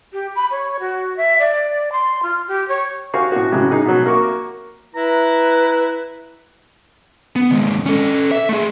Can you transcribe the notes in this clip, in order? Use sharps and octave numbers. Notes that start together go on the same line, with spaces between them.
G4
B5
C#5
F#4
E5
D5
C6
F4
G4
C#5
F#4 G4 C5 F5 G#5 C#6
A2 F#4
A2 C#3 F#3 G#3 G4
D#4 G#4
B2 F#3
A#3 F#4 C#6 D6
E4 B4 A#5
B3
D#2 G#3
C#4 A4
E5
A3 G#4